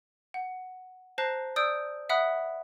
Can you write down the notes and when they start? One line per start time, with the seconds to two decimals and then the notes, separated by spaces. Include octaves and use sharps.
0.34 F#5
1.18 C5 A5 A#5 F#6 A#6 C7
1.56 D5 D#6 E6 G6 D7
2.09 E5 F#5 B5 D#6 F#6